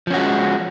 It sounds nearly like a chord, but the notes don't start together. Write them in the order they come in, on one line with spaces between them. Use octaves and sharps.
F3 C#4 F#4 G#3